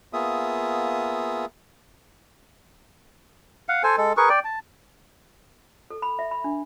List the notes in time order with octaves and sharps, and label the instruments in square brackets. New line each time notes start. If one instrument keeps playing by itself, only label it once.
[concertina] A#3 B3 F4 G#4 E5 D#6
[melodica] F5 F#5
A4 C5 G#5
G#3 A4
G#4 A#4 B4 C#6
D5 G5
A5
[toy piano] A4
B5
E5
B5
D4